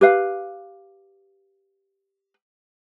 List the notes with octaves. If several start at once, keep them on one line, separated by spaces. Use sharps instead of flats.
G4 B4 F5